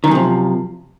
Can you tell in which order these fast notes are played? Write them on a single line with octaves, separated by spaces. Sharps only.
D#3 F#2 C3 F3